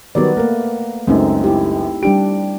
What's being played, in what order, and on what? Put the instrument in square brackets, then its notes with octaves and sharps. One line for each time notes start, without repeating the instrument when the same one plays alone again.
[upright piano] D#3 F#3 G3 [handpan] B3 D5
[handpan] A3 A#3 [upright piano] A#4
[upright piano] C#2 F#2 [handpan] A3 C4 D#4
[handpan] E4 G4
[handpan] G3 D4 G4 [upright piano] D7